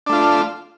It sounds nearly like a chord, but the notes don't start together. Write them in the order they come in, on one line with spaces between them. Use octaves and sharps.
D4 A3 F4